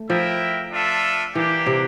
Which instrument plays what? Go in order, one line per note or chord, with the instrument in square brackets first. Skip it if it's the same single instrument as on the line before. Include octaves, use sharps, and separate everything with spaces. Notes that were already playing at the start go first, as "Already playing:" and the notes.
Already playing: [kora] A3
[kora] F3 [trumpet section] E4 A#4 E5 G5
[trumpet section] D4 F4 A4 E5
[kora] E3 [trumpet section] A#3 D4 G4
[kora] C3